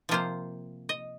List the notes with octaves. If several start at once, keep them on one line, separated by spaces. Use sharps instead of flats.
C3 F3 A#3 F4 C5
D#5